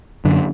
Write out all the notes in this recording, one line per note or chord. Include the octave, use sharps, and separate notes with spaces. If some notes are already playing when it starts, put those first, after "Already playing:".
F#2 D3